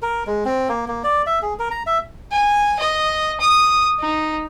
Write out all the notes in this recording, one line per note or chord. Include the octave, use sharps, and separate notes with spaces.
A#4
G#3
C4
A#3
A#3
D5
E5
G#4
A#4
A#5
E5
G#5
D#5
D#6
D#4